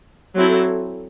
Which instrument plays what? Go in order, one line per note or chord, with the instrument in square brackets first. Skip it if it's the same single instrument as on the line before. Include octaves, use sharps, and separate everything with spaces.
[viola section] F#3 C4 E4 A4